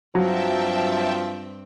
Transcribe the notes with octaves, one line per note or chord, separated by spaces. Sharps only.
G2 F3 F#3 C4 E5 G5 A5